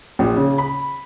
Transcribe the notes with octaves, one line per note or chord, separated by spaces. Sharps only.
A#1
C#3
B5